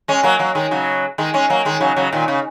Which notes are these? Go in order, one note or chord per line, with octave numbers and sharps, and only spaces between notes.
G#3 C#4
F#3 A#3
F#3 A#3
D#3 G#3
C#3 F#3
D#3 G#3
G#3 C#4
F#3 A#3
D#3 G#3
C#3 F#3
C#3 F#3
A#2 D#3
C#3